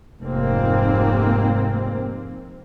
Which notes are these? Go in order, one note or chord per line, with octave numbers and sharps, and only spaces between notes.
F1 G#2 A#3 C4